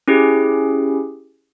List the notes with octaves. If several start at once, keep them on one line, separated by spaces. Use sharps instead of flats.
C#4 E4 G4 G#4